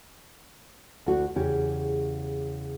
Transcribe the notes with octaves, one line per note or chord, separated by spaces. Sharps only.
D2 F#4
E2 C#3 G4 C#5